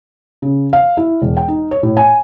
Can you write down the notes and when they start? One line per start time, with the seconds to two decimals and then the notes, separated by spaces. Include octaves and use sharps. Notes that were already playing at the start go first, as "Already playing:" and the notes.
0.42 C#3
0.73 F5
0.97 E4
1.22 E1
1.37 G5
1.48 D#4
1.71 C#5
1.83 A2
1.97 G#5